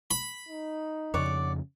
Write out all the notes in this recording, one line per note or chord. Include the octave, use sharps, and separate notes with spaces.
B5
D#4
F2 C#3 C#5 D5 F#5